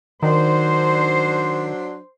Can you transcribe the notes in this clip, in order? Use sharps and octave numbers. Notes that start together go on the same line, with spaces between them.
D#3 F#3 D4 C5